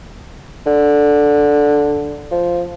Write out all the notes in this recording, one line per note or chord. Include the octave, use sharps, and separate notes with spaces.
D3
F3